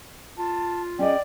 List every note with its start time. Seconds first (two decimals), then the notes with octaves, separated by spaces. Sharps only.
0.38 F4 A5
0.99 C#4 G#4 D5 D#5 G5